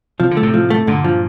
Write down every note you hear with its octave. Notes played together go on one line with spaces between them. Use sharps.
C3 F3
D3
A3
A2 C3
F3
A3
G2 A#2 D3
F3